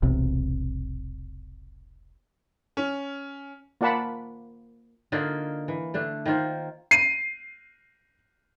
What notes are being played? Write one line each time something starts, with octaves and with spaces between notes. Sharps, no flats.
E1 B1 C3
C#4
A#3 F4 D5 F#5 A5 B5
D3 A#3 D#4 F4
E3
D3 A3 D4
D#3 A#3 F4 C5
C7 D#7